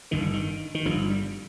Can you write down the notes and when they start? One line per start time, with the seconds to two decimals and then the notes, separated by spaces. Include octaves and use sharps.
0.11 G1 G2 D3 D#3
0.22 D3
0.33 D#3
0.75 D#3
0.85 G1 G2 D3 F3
1.10 G3